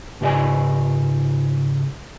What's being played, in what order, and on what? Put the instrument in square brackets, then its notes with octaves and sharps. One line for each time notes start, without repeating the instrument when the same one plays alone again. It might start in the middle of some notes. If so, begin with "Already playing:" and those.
[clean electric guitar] C#2 G#2 G4 D5 D#5 G#5